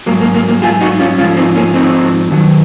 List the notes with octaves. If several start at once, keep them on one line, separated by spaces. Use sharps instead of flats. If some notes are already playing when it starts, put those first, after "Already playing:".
G#2 F#3 A#3
A#3
A#3
A#3
F4 G#4
D#4 F#4
C#4 F4
G#2 F3 C#4 F4
C4 D#4
A#3 C#4
C4 D#4
F#2 D#3 F#3